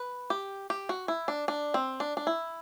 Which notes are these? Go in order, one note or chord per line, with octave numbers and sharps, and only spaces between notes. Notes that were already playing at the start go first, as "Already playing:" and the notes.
Already playing: B4
G4
G4
F#4
E4
D4
D4
C4
D4
D4
E4